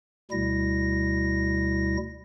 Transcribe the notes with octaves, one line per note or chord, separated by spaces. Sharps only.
D2 B2 G3 E4 A#6